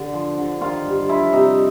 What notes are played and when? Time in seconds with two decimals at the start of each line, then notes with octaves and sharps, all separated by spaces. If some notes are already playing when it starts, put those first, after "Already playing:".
Already playing: D3
0.14 F3
0.38 D3
0.61 D#3 F4 F5
0.85 G2
1.09 F3 E4 E5
1.33 C3 D#4 D#5